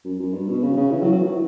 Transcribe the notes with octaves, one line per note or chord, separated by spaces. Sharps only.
F#2
F#2
G2
B2
C#3
C#3
E3
F#3
F#3
E3